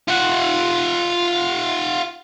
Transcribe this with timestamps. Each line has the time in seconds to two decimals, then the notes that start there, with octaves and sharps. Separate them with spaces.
0.08 F4 F#5